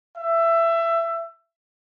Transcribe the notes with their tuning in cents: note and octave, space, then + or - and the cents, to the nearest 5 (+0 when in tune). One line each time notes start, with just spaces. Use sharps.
E5 +20